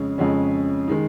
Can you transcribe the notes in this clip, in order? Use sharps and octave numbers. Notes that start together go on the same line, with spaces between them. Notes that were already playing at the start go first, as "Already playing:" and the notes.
Already playing: F2 C#3 G#3 C#4
F2 C#3 G#3 C#4
D#3 G#3 D#4